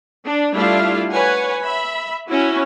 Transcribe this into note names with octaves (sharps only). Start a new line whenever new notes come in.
D4
G3 A3 D4 E4 F4 F5
B4 C#5 F#5 G#5
E5 B5
C#4 E4 F#4